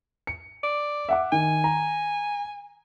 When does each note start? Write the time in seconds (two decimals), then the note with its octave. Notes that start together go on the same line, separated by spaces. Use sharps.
0.27 C#7
0.63 D5
1.09 E5 F#5 D6
1.32 D#3 G#5
1.64 A#5